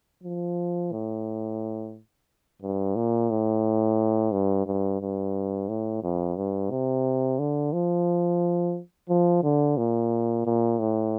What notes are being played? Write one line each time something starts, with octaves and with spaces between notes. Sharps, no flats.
F3
A2
G2
A#2
A2
G2
G2
G2
A2
F2
G2
C3
D3
F3
F3
D3
A#2
A#2
A2